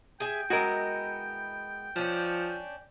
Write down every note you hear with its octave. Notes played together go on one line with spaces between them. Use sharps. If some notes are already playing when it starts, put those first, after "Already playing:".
G#4 E5 G5 G#5
G#3 B3 E4 F#4 A#4
F3 C#4 D4